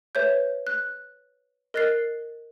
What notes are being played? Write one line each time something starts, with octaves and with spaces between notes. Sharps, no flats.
B4 C#5 E5 G6
F#6
A#4 D#5 F#6 A6 C7